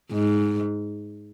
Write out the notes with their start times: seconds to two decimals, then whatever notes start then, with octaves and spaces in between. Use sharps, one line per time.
0.12 G#2